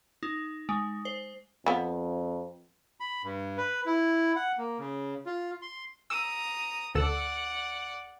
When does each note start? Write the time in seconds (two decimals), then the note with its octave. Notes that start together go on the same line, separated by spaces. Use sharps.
0.23 D#4
0.69 G#3
1.05 C5
1.66 F2 F3 B3
3.00 B5
3.24 G2
3.58 B4
3.86 E4
4.36 F#5
4.58 A#3
4.79 C#3
5.26 F4
5.62 C6
6.10 A#5 D#6 E6
6.95 D2 A4 D5 F#5 E6